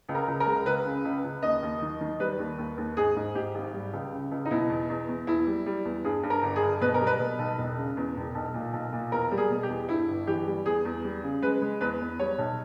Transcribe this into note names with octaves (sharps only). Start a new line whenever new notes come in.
C#2
A#4
C#2
A#4
G#3
C#2 B4
C#3
C#2
C#2
D#2 D#5
D#2
D#3
D#3
G3 B4
D#2
D#2
D#2
G#2 G#4
G#2
G#2 G4
G#1
G3
C#2
C#3
C#2
D#4
B2 E4
E2
E2
E2
E2 E4
G3
G3
E2
G2 G#4
G2
A#4
G1
G#4
G1
B2 B4
A#4
G3
B4
B2
B1
E1
C#3
E2
E1
B1
A#2
B1
A#2
E2 A#4
G3
G#4
B2
G4
E2
G2 E4
G1
E3 G4
G3
E2 G#4
E2
G3
C#3
G#3 B4
G#3
E2 B4
E2
G3 C#5
B1